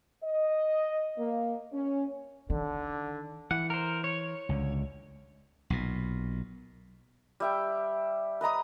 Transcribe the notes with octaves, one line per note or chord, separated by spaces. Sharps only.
D#5
A#3
C#4
D3 D#3
E3 F#5
A#4 C5
C#5
C#2 D3
B1 A#2
G3 E5 G5
B4 D#5 A#5 D#6